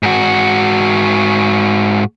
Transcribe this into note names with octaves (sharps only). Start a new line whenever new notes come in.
G#2 F#4